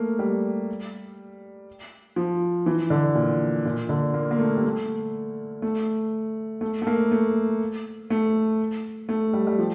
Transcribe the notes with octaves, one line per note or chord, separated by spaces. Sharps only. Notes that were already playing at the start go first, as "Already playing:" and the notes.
Already playing: A3 A#3
G3
F3
E3
D3
A#2
A#2
D3
A#3
A#3
A3
G3
A3
A3
A3
A3
A#3
A3
A3
A3
G3
G3
F3